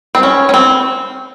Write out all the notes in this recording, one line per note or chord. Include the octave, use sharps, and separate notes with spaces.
C4
C#4
C#4
C4